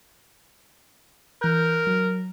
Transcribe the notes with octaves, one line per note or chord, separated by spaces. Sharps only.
E3 A#4 F#6 G6
F#3